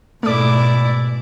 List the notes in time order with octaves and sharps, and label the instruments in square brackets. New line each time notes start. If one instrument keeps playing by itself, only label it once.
[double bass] G#2 B2 [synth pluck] A3 D6 [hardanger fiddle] E4 D5